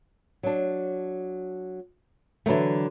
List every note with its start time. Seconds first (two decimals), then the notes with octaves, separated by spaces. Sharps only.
0.43 F#3 D4
2.46 D3 E3 F#3 A3